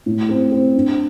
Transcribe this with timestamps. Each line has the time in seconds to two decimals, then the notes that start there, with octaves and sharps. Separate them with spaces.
0.06 A2
0.29 C4
0.52 C4
0.75 D4